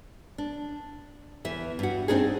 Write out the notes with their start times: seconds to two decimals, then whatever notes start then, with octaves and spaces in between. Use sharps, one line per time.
0.38 D4
1.45 E2 E3 E5
1.79 G2 F#4
2.08 C4 D4 D#4 G#4